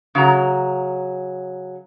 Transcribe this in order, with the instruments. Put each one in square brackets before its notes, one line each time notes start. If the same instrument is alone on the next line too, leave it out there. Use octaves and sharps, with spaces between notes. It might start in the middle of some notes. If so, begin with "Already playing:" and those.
[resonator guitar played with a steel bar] C#3 F#3 A#5